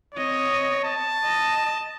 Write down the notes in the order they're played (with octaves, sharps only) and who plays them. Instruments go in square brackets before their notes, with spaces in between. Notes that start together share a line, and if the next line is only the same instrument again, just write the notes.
[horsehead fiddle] C4 D#5 [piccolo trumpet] C#5
[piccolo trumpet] A5
[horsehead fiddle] D#5